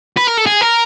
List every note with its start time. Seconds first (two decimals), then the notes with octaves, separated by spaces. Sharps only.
0.17 B4
0.27 A#4
0.38 A4
0.46 G#4
0.61 A#4